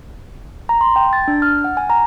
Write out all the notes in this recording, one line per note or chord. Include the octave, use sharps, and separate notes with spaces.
A#5
C6
G5
A6
D4
F6
F#5
G#5
A#5